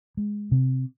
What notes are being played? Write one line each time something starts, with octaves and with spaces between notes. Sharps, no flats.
G#3
C3